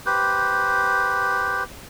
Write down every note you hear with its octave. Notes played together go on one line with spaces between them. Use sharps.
G4 B4 C5